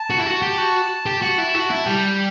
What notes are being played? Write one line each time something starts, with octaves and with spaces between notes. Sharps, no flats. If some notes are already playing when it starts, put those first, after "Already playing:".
Already playing: A5
F#4
E4
F#4
G4
F#4
G4
F#4
E4
F#4
E4
G3 G5